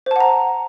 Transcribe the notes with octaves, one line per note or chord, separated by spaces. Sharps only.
C5 F#5 A5 A#5